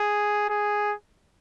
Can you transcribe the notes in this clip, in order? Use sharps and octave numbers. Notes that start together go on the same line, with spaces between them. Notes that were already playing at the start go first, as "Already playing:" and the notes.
Already playing: G#4
G#4